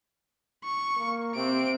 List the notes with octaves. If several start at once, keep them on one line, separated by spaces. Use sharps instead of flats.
C#6
A#3
C3 C4 D7